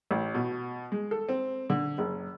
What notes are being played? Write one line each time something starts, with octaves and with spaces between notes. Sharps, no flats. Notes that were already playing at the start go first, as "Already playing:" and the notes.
A1
B2
G#3
A4
C4
D3
F#1